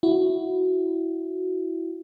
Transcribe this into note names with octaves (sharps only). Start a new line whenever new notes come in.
E4 F#4